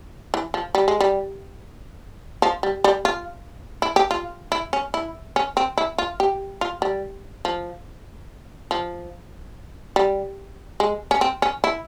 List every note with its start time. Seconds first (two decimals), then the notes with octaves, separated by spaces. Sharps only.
0.34 E3
0.54 F3
0.75 G3
0.88 G#3
1.01 G3
2.42 F3
2.63 G3
2.84 G3
3.05 F4
3.82 E4
3.96 G4
4.11 F4
4.52 E4
4.73 C#4
4.94 E4
5.36 C#4
5.57 C4
5.78 E4
5.98 F4
6.20 G4
6.61 F4
6.82 G3
7.45 F3
8.71 F3
9.96 G3
10.80 G#3
11.11 C#4
11.21 C4
11.42 C#4
11.64 E4